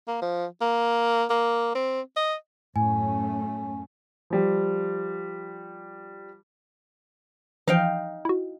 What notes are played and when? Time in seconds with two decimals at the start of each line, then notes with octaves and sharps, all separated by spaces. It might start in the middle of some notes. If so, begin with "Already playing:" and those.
0.08 A#3
0.22 F3
0.61 A#3
1.30 A#3
1.75 C4
2.17 D#5
2.76 F#2 A2 A3 C#4 G#5
4.30 F3 G3
7.67 E3 F3 D#4 F5 G5
8.25 E4 F#4